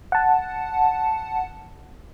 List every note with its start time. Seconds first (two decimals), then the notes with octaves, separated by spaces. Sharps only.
0.12 F#5 A5